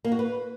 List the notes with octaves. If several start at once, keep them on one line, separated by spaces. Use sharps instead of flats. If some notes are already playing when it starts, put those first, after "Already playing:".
A#3
F#4
B4